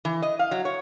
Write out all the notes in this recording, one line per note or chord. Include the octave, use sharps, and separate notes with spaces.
E3
D#5
F5
F#3
C#5